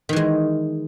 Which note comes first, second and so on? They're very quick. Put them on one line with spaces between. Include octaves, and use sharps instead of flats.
D#3 E3 G#3